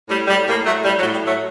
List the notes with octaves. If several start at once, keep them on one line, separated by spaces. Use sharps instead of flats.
A2 G3
A2 G3
A2 G3 A#3
A2 F#3 A3
A2 G3
F#3
A2
G3
A2 F#3 A3